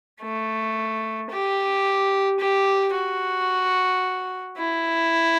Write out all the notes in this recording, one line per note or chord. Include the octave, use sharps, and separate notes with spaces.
A3
G4
G4
F#4
E4